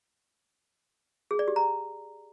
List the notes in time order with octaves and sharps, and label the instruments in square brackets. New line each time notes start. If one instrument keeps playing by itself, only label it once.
[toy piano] G#4
D5
G4
A#5